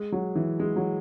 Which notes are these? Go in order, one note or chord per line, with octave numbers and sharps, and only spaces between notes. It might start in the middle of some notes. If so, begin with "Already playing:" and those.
Already playing: G#3
F#3
E3
G#3
F#3